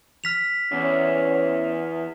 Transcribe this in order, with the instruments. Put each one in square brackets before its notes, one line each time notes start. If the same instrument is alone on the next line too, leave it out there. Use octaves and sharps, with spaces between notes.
[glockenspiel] F6 B6 F7
[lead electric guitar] E2 [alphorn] C#4